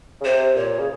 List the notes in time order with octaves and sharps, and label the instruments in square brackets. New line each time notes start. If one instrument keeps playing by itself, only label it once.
[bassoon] C#3
[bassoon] C3 [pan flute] C5
[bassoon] A#2 [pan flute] C#5
[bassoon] C#3